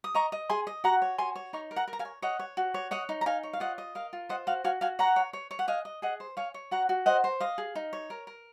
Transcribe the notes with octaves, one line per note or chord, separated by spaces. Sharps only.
D#6
D#5 A#5 C#6
D#5
G#4 G#5 C6
D#5
F#4 F#5 A#5
C#5
F#4 G#5 C6
C#5
D#4 A#5 C#6
A#4
F#5 A#5
A#4
A#5
F5 G#5
C#5
C#5 D#5 F#5
C#5
F#4
C#5
C#5 D#5 F#5
D#4
A#5
D#4 F5 G#5
C#5
F5
F4 D#5 F#5
D#5
A#4 F5
F4
C5 D#5 F#5
F#4 F5
F#4 F5 G#5
F#4 F5 G#5
C#5 F#5 A#5
C#5
C#5
C#5
F#5
D#5 F5 G#5
D#5
G#4 D#5 F#5
C5
C#5 F5 G#5
C#5
F#4 F#5 A#5
F#4
C5 D#5 F#5
C5
D#5 F5
G#4
D#4
C#5
A#4
A#4